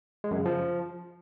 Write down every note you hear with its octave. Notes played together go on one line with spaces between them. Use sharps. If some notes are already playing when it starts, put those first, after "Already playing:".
G#3
F#2
C#3
F3